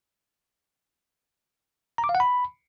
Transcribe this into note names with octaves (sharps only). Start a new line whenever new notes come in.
A#5
D6
F5
F#5
B5